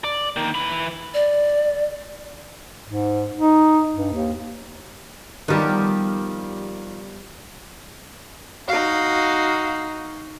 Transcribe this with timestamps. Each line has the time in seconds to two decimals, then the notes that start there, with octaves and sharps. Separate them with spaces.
0.04 D5
0.36 D#3 A#3
0.55 E3 B5
1.14 D5
2.86 G#2
3.37 D#4
3.96 G2
4.13 D#2
5.48 D#3 F3 G3 B3 G4
8.68 D#4 F#4 F5